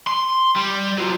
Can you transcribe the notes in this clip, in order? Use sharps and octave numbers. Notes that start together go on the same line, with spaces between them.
C6
G3
F#3 F4